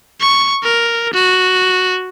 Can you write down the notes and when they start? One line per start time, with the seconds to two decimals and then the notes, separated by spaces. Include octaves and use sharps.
0.20 C#6
0.63 A#4
1.14 F#4